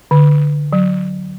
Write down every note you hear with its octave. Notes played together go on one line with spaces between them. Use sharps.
D3
F#3